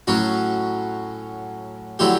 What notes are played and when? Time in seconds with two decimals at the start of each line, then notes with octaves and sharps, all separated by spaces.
0.07 A2 F#3 C#4 F#4
1.99 D3 F#3 A3 E4 G4